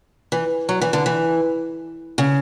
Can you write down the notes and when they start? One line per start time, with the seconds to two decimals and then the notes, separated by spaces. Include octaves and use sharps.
0.32 E3
0.69 F#3
0.81 E3
0.93 D3
1.06 E3
2.18 C#3